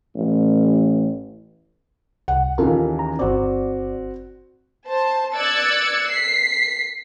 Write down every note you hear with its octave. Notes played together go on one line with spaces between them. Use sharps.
A1
C2 F#5
D#2 C#3 E3 F4 A4 A#4
A#5
G1 C4 F#4 D5
C5 A5
D5 E6 F#6 G#6 A6 C#7
B6 C7